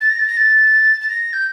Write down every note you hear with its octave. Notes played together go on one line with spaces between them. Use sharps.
A6
A#6
A6
A#6
A6
A6
A#6
G6